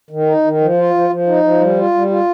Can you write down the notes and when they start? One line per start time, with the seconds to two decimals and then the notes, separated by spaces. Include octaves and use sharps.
0.10 D#3
0.26 D#4
0.44 D#3
0.61 F3
0.77 F4
0.94 F3
1.10 F3
1.27 D#4
1.43 F3
1.61 G3
1.77 F4
1.94 G3
2.10 F4